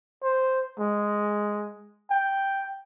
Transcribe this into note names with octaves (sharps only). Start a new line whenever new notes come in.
C5
G#3
G5